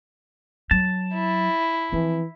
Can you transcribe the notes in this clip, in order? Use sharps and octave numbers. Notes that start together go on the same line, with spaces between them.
F#3 A5
E4
E3 F3 C4